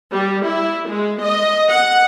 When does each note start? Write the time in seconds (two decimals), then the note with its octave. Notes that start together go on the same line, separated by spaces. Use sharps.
0.12 G3
0.46 E4
0.89 G#3
1.22 D#5
1.69 F#5